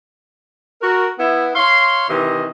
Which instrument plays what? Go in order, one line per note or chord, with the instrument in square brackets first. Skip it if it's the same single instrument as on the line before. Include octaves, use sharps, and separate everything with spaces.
[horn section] F#4 A#4
B3 E4
C#5 F5 C6
C3 D#3 E3 D#5